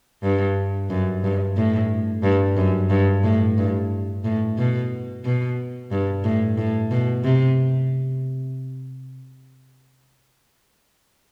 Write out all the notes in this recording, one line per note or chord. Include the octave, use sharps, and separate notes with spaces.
G2
F#2
G2
A2
G2
F#2
G2
A2
G2
A2
B2
B2
G2
A2
A2
B2
C3